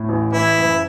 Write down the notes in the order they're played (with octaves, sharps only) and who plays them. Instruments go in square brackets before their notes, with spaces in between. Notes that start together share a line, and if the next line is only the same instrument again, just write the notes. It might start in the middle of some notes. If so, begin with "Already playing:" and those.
Already playing: [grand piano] A2
A1
[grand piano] E3 [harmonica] E4
[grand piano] F#1